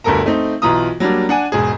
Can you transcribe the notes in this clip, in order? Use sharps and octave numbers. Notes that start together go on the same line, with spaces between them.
G1 D2 G2 A4 A#4 A#5
A3 C4 D#4
B1 E3 F4 A#5 D#6
F#3 G3 A#3 D4
D4 F#5 G#5
E1 G#2 G#4